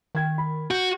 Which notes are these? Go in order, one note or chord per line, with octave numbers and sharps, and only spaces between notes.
D#3 G5 G#6
B5
F#4 G6